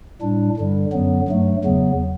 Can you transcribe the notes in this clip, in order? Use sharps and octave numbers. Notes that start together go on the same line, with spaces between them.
A2 G3 D4
G2 D3 G3
F#2 D3 F#3 B3
G2 F#3 A3
E2 C#3 F#3 B3